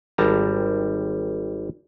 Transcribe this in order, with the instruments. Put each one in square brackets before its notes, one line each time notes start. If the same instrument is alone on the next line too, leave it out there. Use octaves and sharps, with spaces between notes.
[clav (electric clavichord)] G#1 G3 A5 A#5